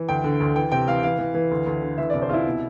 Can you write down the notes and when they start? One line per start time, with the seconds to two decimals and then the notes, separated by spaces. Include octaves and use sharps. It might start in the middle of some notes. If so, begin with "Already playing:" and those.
Already playing: E3
0.08 D2 G5
0.24 D3
0.40 D2
0.56 E3 G5
0.72 C3 G5
0.88 E3 F5
1.03 E3 F5
1.19 E3
1.34 E3
1.51 D2
1.66 D2
1.82 D3
1.98 E3 E5
2.10 D5
2.13 C2
2.22 C5
2.29 C2 E4 F4
2.45 B2